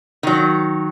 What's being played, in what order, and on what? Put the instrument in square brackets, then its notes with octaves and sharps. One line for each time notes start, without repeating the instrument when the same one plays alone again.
[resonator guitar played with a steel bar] D#3 F#3